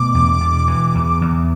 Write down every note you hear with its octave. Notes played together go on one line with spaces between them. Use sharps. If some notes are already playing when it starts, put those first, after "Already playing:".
Already playing: B2 A3 D6
E2
B2
E3
E2
E2